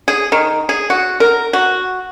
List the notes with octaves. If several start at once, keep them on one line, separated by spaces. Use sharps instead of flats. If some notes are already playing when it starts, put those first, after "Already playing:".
G#4
D#3
G#4
F#4
A#4
F#4